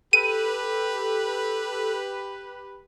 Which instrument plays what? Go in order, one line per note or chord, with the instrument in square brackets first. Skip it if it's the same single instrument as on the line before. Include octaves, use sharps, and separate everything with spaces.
[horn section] G4 B4 [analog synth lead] A4 [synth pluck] D#7